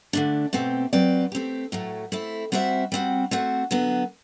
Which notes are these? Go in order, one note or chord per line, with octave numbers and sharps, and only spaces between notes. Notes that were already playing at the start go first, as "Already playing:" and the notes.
D3 A3 D4
B2 A3 C4 G4
F#3 C4 G4 B4 D5
A3 C4 G4
A2 F#3 A3
A3 C4 E4
G3 C4 F#4 C5 E5
G3 C4 F#4
A3 C4 F#4 C5
D3 F#3 B3